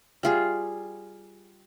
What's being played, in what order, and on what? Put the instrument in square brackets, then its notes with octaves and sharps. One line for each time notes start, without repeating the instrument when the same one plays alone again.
[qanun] G3 F4 G#4